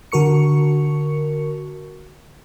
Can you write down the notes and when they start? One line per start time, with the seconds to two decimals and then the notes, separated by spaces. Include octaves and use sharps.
0.12 D3 F#4 A#4 C#6 C#7